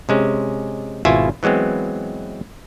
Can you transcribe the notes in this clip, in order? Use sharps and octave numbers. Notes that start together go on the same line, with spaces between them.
C3 G#3 C#4
G#1 B2 E4 F4 E5 G#5
E3 F#3 G#3 B3 C4